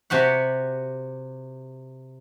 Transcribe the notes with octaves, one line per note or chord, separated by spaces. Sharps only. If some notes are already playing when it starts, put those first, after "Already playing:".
C3 F#4 G4 F#5